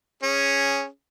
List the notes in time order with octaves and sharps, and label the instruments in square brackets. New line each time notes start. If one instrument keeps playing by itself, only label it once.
[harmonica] C#4 G#4